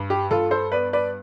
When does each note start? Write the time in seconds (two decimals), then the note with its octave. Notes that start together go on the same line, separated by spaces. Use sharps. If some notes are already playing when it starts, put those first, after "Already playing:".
Already playing: G2
0.10 G4
0.31 G2 F4 A4
0.51 A4 C5
0.72 B3 B4 D5
0.93 B4 D5